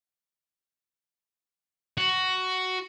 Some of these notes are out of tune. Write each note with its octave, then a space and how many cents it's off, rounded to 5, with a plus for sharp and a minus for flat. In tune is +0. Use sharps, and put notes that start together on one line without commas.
F#4 +10